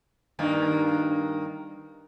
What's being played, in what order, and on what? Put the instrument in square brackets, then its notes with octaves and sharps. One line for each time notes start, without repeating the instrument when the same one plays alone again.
[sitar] G2 D#3 A#3